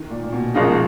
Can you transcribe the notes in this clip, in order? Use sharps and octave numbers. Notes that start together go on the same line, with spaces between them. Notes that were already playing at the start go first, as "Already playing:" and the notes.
Already playing: D#3
A#2
A#2
B2
F#1 F#2 C#3 F3 G#3 D#4
B2